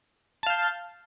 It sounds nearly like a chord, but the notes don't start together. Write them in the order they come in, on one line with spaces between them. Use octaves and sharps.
A5 F5 G6